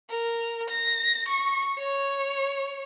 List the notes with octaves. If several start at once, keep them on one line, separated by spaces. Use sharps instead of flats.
A#4
A#6
C#6
C#5